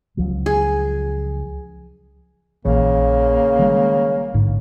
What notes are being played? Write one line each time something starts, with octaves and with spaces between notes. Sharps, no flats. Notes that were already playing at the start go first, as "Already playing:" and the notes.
C#2 F3 F#3
G#4
A#1 C#3 E3 A#3
D#3 G3 G#3
A1 G#2 D3